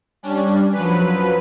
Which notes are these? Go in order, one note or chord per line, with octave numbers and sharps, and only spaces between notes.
G3 C#4 D4
F#2 F3 F#3 B4